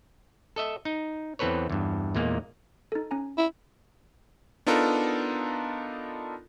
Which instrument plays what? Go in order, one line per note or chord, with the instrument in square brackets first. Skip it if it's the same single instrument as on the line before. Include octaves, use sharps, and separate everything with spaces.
[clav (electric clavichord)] A4 D#5 E5
D#4
E2 E3 C4 A4 B4 C#5
E2 G2
E2 A#2 G#3 A#3
[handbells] D#4 A4
C#4 G#5 A#5
[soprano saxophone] E4
[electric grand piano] B3 D4 D#4 F4 A4 A#4